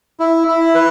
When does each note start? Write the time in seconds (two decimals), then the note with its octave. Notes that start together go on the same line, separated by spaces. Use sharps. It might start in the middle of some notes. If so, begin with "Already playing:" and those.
0.20 E4
0.48 E4
0.75 B4